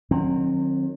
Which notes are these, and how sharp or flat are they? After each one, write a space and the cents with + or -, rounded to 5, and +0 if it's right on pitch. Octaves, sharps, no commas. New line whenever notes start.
D#3 -35 F#3 -20 C4 +30